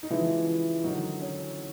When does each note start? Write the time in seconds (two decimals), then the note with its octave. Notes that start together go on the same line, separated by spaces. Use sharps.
0.03 D#4
0.10 C#3 E3 F3 G#3 E4
0.84 D3 D#3 F#3 D#4
1.22 C#4